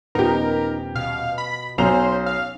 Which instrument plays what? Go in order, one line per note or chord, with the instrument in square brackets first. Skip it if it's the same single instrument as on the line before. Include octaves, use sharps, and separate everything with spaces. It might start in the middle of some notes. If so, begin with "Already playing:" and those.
[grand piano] D#1 G4 [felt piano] F3 B3 [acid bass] D#4 [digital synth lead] A#4
[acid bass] B2 [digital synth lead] F5
[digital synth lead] B5
[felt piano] B1 [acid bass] C#4 [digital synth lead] C5 [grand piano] A#5 F7
[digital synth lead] F5